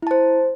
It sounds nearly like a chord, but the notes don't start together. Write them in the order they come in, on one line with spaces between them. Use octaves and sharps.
E4 A5 C5